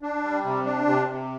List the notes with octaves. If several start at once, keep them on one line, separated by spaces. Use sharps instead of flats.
D4
G3
C3
D4
C3
C3